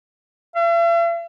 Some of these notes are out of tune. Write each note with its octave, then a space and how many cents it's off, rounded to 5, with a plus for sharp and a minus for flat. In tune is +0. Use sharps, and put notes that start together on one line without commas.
E5 +45